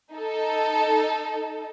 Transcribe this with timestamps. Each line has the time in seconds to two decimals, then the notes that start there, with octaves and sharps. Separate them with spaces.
0.14 D#4 A4